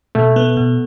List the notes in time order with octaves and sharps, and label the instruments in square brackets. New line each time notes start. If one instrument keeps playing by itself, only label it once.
[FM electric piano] B2 [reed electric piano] A3
[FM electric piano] B3
B2